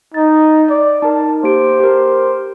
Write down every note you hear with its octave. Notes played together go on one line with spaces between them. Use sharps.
D#4 A6
D5
D#4 A#4 A5
A#3 G4 C5 D7
G4 A#4